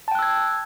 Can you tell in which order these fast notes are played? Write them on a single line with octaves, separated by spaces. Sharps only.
A5 G5 F#6 E6 G#6